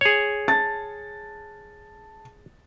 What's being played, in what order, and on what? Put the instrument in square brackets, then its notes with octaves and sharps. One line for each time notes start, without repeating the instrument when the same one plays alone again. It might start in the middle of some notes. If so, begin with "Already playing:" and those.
[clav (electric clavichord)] G#4 C#5
[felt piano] A5 A6